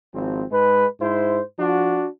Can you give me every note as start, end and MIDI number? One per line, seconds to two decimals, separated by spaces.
0.14 0.45 32
0.14 0.45 53
0.14 0.45 60
0.51 0.86 44
0.51 0.86 56
0.51 0.86 71
1.01 1.42 44
1.01 1.42 64
1.01 1.42 72
1.59 2.06 53
1.59 2.06 62
1.59 2.06 66